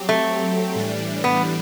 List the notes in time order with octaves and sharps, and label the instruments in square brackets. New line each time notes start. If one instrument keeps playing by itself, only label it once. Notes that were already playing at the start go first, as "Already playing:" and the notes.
Already playing: [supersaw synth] F#3 C4 G4
[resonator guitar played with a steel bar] A3
[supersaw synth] A2 E3 G3 D4
[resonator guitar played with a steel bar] B3